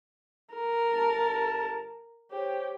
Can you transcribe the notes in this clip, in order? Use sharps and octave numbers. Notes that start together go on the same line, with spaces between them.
A#4
G1 A5
G4 C5 C#5 G5